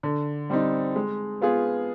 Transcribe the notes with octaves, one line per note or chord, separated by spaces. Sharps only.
D3
G3 C4 D#4
G#3
B3 F4 G#4